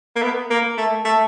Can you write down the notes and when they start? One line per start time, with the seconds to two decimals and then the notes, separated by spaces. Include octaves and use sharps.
0.16 A#3
0.22 B3
0.50 A#3
0.78 A3
1.05 A3